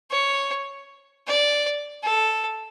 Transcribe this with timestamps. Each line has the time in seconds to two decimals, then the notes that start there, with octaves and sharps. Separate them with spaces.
0.11 C#5
1.27 D5
2.04 A4